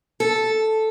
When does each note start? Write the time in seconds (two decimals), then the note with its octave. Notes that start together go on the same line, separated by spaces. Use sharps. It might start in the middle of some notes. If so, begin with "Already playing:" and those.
0.20 A4